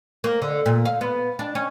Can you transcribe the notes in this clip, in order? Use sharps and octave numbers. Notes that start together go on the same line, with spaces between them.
A#3
D3
A#2
F5
B3
D4
C#4